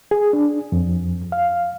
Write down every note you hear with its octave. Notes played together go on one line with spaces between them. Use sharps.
G#4
D4
F2
F5